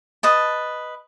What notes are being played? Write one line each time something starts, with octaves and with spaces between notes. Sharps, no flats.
B4 D#5 A5